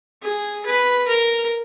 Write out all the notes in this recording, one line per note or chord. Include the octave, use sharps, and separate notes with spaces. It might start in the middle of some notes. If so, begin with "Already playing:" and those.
G#4
B4
A#4